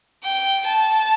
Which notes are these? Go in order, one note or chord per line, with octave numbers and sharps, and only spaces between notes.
G5
A5